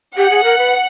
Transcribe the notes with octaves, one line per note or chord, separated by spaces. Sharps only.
G4 F#5
G#4
A#4
B4